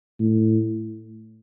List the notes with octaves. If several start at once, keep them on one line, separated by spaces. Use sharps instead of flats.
A2